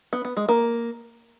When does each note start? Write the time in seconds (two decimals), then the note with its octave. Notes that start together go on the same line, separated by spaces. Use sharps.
0.13 B3
0.25 B3
0.37 G#3
0.49 A#3